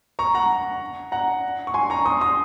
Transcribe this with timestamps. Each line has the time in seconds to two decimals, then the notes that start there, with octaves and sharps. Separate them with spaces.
0.19 A#5 C#6
0.35 F#5 A#5
1.12 F#5 A#5
1.67 C#6
1.74 G#5 C6
1.90 A#5 C#6
2.05 C6 D#6
2.21 C6 D#6